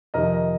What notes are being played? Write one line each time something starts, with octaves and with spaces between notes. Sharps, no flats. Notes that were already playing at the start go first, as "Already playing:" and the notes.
F2 C3 D#3 A#4 D#5
A#4 D#5